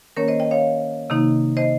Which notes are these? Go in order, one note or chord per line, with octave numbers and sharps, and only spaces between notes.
D#3 A#3 C#4 A#4 C#5
C5 D#5
D#5 G5
C#5 F5
C3 D#3 A#3 D#4
C5 D#5